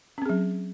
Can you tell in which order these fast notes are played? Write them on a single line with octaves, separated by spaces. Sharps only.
C#4 C4 G#4 F#3